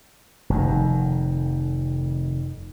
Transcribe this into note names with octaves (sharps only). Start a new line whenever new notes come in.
F1 F2 D#3